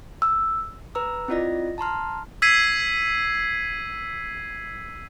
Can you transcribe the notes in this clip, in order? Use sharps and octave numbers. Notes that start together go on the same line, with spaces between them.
E6
B4 A#5 E6
C4 E4 F4 D5 D#5 A#6
A5 A#5 C6 F6
E6 G#6 B6 C7 D#7